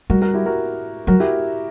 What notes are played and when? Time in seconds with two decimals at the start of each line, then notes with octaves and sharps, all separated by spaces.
0.10 G3 F#4 A#4
0.22 F#4 A#4
0.34 E4 G4
0.46 F#4 A#4
1.07 F#3 F#4 A#4
1.20 E4 G4